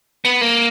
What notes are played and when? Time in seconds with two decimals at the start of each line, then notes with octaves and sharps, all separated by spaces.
0.25 B3
0.41 A#3